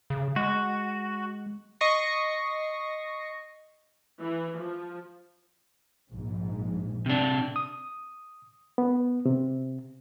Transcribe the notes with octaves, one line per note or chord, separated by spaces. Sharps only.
C#3
G#3 F#4
D#5 C#6 A#6 C7
E3
F3
A#1 G#2
C3 D4
D#6
B3
C3